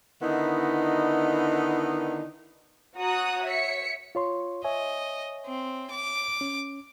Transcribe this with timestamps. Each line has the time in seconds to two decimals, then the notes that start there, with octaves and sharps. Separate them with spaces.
0.21 D3 D#3 B3 D#4 E4
3.00 F#4 C#5 A#5 D#6 F#6
3.45 C#5 E5 B6 C#7
4.15 F4 C#5 C6
4.64 C#5 D#5 E5 G#5
5.46 C4
5.90 D6
6.41 C#4